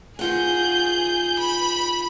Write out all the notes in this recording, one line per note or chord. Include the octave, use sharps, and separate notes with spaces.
D#3 F4 G#4 F#5 G6
B5